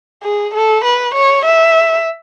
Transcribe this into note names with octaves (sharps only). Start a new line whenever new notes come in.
G#4
A4
B4
C#5
E5